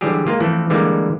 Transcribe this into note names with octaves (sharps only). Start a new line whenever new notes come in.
D3 E3 F#3 G3 G4 G#4
G#3 A#3 F4
E3 F3 A3 C4
D3 E3 G3 G#3 A#3